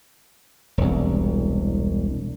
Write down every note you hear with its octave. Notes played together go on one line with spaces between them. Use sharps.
E1 C2